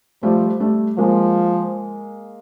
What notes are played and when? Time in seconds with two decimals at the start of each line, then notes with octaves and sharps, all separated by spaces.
0.23 F3 G3 A3
0.60 G3 A3
0.98 F3 G#3 A#3